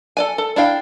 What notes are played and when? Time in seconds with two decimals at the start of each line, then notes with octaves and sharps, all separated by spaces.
0.17 A4 D5 G#5
0.38 A4
0.56 D4 E4 F5 G5